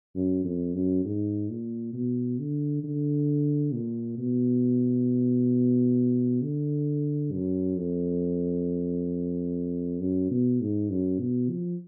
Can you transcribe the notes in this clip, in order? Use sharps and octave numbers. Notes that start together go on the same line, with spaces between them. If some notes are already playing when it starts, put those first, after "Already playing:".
F#2
F2
F#2
G#2
A#2
B2
D3
D3
A#2
B2
D3
F#2
F2
F#2
B2
G#2
F#2
B2
F3